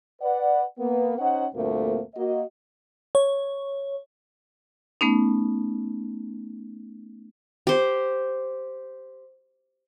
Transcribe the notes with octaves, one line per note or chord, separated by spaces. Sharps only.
B4 D5 F#5
A#3 B3
C#4 D#4 C5 F#5
D2 G2 A#2 A3 A#3 C4
A#3 F#4 D#5
C#5
A3 B3 C#4 D#4
G4 C5